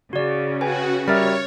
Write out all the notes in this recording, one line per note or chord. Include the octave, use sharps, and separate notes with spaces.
C#3 F#4 D5
F#4 B4 G5 G#5
G3 A#4 C#5 E5 F6 A6